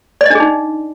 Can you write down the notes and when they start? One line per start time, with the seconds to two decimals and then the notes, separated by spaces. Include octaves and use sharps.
0.21 D5
0.26 D#5
0.30 D4
0.35 G#4
0.40 D#4